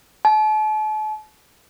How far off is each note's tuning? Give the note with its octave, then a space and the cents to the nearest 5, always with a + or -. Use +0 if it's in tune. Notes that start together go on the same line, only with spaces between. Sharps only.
A5 -40